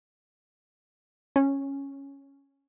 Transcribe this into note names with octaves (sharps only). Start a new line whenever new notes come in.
C#4